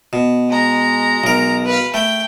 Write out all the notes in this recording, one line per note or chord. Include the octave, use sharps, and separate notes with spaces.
B2
G#3 A#5
B1 A#4
B4 F5
A3 G5